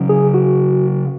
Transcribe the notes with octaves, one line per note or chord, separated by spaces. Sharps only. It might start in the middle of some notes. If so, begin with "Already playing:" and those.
Already playing: C#3 F#3 C#4
G#4
F#4